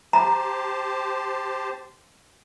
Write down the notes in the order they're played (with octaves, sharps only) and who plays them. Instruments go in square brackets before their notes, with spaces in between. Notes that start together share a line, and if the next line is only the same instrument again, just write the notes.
[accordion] G4 C5 A5 [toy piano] A#5